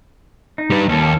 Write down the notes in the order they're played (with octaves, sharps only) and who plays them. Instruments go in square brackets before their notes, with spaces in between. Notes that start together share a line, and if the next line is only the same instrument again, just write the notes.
[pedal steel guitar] D#4
[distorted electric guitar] G3 B4
[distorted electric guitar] D#2 [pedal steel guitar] A#3 C#4 A4